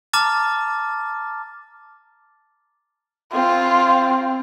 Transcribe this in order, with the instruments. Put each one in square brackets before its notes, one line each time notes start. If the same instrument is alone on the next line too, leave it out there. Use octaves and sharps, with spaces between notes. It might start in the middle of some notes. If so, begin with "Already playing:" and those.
[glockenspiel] A5 A#5 D6 F6 A6
[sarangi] C4 [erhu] F4